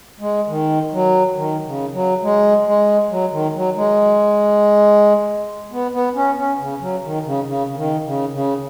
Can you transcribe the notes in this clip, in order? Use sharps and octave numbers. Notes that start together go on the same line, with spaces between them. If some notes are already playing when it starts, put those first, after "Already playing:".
G#3
D#3
F#3
D#3
C#3
F#3
G#3
G#3
F#3
D#3
F#3
G#3
B3
B3
C#4
C#4
C#3
F#3
D#3
C#3
C#3
C#3
D#3
C#3
C#3